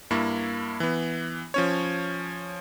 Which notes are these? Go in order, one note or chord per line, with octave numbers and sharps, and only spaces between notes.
G2 A#3 E4 C#6
E3 B3
F3 C#4 C#5